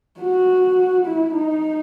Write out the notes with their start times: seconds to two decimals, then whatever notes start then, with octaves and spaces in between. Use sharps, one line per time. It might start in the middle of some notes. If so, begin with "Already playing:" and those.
0.20 F#4
1.06 E4
1.35 D#4